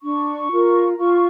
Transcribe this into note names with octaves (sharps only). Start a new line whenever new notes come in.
D4 C#6
F4 A#4
F4 C#6